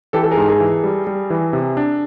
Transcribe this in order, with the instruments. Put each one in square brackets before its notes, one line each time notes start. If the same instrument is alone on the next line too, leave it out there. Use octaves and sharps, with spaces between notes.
[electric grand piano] E3 [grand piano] G4 A4
[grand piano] A4
G#4 A#4
[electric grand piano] G#2
[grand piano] G#4 A#4
[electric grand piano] E3
G3
G3
E3
C3
D4